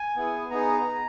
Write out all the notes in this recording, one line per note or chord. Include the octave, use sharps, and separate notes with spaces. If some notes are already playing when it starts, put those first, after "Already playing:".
Already playing: G#5
B3 E4 G#4
B3 D#4 G#4 A#5